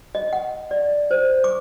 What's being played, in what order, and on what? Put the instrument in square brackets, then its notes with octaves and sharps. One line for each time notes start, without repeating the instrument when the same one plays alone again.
[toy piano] D#5
F#5
D5
C5
D6